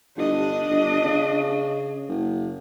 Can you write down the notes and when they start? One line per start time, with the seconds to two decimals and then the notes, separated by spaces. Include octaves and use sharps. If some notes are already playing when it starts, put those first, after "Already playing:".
0.17 G1 D4 D#5
0.70 G1
1.05 C#3
2.09 F#1